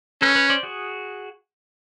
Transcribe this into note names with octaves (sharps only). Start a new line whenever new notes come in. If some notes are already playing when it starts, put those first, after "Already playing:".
C#4 A4 B4
B4 C#5
C5 D5
F#4 G#4